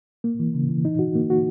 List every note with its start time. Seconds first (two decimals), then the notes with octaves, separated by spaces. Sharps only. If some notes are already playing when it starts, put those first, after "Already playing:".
0.24 A#3
0.39 E3
0.54 C#3
0.69 E3
0.85 D#4
0.99 F#4
1.15 A#3
1.30 F#4